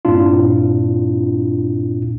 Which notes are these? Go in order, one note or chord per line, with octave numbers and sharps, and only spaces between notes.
G2 A#2 C4 D4 E4 F4